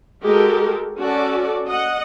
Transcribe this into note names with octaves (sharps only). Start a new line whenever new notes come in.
G#3 F#4 G4 A4 A#4
C#4 F#4 A4 D5
D#5 F#5